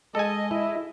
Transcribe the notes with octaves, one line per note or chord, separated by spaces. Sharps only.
G#3 A4 D#5 G#5
E4